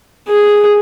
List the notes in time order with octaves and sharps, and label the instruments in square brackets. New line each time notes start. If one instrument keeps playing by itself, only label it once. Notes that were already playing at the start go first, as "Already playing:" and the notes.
[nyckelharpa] G#4